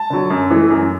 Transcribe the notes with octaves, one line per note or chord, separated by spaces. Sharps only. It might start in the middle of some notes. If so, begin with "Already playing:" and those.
Already playing: A5
D3 F#3
F#2
E3 A3
F#2